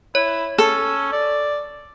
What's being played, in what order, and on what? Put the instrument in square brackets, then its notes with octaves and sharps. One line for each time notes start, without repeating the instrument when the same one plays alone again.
[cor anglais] E4 [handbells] C#5
[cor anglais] C#4 [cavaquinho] A4
[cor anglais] D5